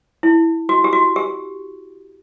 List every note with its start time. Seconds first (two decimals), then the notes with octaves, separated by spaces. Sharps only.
0.23 E4
0.69 F#4
0.84 G4
0.93 F#4
1.16 G4